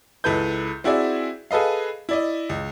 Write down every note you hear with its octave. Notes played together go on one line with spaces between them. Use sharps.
C#2 E4 A4 B4 G6
C4 E4 F#4 G#4 D5 E5
G#4 A4 B4 D#5 F5
E4 D5 D#5
C#2